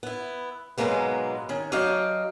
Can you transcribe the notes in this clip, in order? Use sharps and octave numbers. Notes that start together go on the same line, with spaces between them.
B3 E4
G#2 B2 F#3 G#3 A#3 B3
D#3 C#4
F#3 D4 D#5 F5 G5